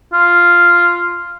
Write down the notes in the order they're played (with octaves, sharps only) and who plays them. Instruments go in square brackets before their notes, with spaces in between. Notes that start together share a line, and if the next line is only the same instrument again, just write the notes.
[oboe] F4